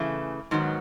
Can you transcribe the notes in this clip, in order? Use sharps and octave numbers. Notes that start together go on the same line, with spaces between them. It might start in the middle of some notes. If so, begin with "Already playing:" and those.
Already playing: C#3 E3 A3
G#2 D#3 F#3 B3